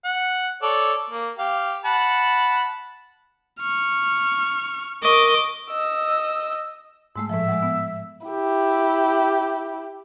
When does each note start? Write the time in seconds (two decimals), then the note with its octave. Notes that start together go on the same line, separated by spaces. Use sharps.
0.05 F#5
0.63 A4 C#5 D5
1.10 A#3
1.39 G4 F5
1.85 F#5 A5 B5
3.60 C#6 F6
5.03 A#4 D#5 C#6 D6
5.71 D#5 E6
7.16 G#2 G#3 A3 E6
7.29 A2 F3 E5
7.48 G#3 F#5
7.62 B3
8.27 E4 G4